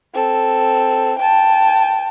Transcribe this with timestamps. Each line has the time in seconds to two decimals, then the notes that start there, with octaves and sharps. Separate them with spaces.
0.14 C4 A4
1.18 G5 A5